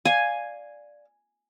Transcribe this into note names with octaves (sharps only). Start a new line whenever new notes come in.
D5 F5 G#5